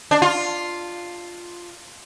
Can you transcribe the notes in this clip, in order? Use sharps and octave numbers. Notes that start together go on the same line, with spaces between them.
D4
F4